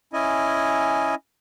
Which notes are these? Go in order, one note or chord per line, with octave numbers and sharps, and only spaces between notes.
C#4 E4 D#5 G#5